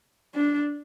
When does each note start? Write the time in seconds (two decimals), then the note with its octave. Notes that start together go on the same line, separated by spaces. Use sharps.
0.34 D4